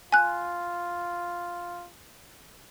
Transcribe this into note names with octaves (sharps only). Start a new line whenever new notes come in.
F4 G#5 F#6